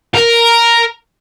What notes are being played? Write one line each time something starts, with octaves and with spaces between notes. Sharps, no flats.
A#4